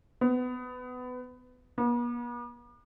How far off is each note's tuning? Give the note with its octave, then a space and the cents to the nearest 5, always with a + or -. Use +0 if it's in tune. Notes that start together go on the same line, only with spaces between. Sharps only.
B3 +25
B3 -45